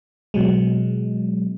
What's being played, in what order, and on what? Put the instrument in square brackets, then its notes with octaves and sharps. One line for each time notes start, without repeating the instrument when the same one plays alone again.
[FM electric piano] B2 F#3 G#3